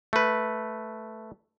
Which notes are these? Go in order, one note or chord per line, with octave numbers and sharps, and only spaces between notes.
A3 B4